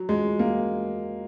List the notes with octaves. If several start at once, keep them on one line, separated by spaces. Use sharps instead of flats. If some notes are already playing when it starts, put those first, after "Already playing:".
Already playing: F#3
G#3
A#3